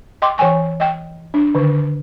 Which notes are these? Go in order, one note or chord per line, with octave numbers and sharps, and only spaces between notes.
D#5 G5 C6 D6
E3 C#5 G5 G#5 C#6
D#5 G5
D4
D3 D#3